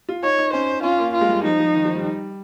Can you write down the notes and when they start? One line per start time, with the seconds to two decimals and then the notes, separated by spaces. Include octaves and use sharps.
0.09 F4
0.23 D#4 C#5
0.38 D#4
0.53 C#4 C5
0.83 C#4 F4
0.98 A#3
1.14 F4
1.21 G#3
1.29 G3
1.44 F3 D#4
1.60 F3
1.75 D#3
1.85 F3
1.95 G3